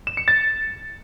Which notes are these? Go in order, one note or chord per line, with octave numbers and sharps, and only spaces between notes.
E7
C#7
A6